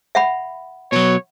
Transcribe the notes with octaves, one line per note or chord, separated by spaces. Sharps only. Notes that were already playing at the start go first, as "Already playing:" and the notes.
E5 F#5 B5
B2 F#3 C#5